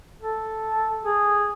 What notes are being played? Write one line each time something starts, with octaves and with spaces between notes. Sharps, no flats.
A4
G#4